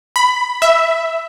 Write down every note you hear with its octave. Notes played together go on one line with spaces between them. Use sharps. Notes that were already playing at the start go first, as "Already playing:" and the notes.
B5
E5